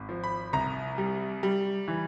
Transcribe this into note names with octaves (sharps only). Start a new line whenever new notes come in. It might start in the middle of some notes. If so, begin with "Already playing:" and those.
Already playing: G#1
F3
B5
C2 A#5
G3
G3
E3